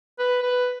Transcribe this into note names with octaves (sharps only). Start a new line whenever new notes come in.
B4
B4